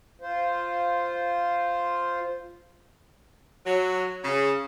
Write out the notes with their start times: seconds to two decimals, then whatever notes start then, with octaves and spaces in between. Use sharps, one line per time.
0.21 F4 C5
3.66 F#3
4.24 C#3